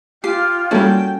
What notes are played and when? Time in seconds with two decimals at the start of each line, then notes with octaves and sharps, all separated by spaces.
0.24 F4 G4 G5 C7
0.71 G3 A#3 C#4 E4 F#4 A4 G5